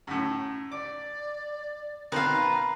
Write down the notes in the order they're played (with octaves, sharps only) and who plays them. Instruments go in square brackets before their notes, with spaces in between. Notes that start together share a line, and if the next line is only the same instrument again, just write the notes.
[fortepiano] F#2 A2
[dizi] D5 [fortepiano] D6
[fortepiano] B2 D#3 C4 [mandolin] B4 F5 [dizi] A#5